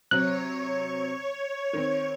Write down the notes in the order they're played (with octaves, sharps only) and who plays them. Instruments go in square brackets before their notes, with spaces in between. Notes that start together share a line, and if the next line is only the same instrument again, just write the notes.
[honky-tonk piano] C3 F#3 C4 [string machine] C#5 [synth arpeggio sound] F#6
[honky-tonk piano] D#3 C4